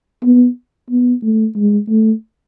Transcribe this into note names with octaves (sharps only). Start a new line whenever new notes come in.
B3
B3
A3
G#3
A3